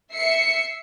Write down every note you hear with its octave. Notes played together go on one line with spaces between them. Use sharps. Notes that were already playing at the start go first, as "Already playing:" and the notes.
E5 C7 C#7